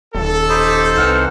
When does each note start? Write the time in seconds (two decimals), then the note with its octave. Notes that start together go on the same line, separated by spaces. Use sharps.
0.15 D#1 A4
0.49 D#4 C5 B5 D6 D#6
0.97 C2 E3 F#5 F6